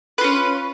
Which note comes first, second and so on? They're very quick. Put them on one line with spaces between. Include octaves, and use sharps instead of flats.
B4 F4 C#4